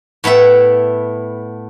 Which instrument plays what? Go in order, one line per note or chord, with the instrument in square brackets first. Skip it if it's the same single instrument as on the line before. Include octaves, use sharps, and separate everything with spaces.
[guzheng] A2 B3 E4 E5